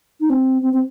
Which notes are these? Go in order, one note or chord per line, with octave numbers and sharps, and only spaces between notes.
D#4
C4
C4
C4